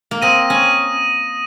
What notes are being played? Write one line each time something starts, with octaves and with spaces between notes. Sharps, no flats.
A#3
C4 D#6 A#6 D#7
C#4